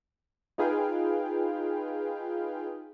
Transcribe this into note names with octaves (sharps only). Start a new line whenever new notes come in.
D#4 F4 G#4 B4 F5 G5